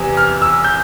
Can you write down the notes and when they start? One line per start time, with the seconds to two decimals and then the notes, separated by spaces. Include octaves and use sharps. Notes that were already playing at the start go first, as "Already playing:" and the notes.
Already playing: E2 C3 E3
0.17 F6
0.42 E6
0.65 G6